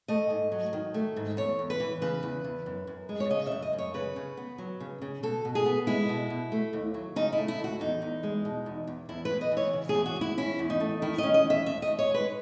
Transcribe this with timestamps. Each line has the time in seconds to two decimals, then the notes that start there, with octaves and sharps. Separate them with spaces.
0.08 A3 D#5
0.30 G#2
0.52 F#3
0.73 D#3
0.94 A3
1.16 G#2
1.37 E2 C#5
1.59 E2
1.70 B4
1.80 E3
2.02 C#3 B4
2.23 E2
2.44 E2
2.66 F#2
2.87 F#2
3.09 G#3
3.20 C#5
3.30 C#3 D#5
3.47 F#2 E5
3.62 D#5
3.73 F#2
3.78 C#5
3.94 C#3 B4
4.16 C#3
4.37 B3
4.58 F#3
4.80 C#3
5.02 C#3
5.23 B2 A4
5.45 B2
5.55 G#4
5.66 B3
5.87 G#3 E4
6.09 B2
6.30 B2
6.52 A3
6.73 D#2
6.94 F#3
7.16 C#3 D#4
7.32 E4
7.38 A3
7.48 E4
7.59 D#2
7.64 F#4
7.80 E2 D#4
8.02 E2
8.23 G#3
8.45 B2
8.66 E2
8.87 E2
9.09 E2 E4
9.25 B4
9.30 E2
9.41 D#5
9.52 E3
9.57 C#5
9.73 C#3
9.89 G#4
9.95 E2
10.06 F#4
10.16 E2
10.21 E4
10.37 C#4 E4
10.59 E2
10.70 D#4
10.80 A3
11.02 D#3 E4
11.18 C#4 D#5
11.34 D#5
11.44 E2
11.50 E5
11.66 D#2 E5
11.82 D#5
11.88 D#2
11.99 C#5
12.10 G#3 B4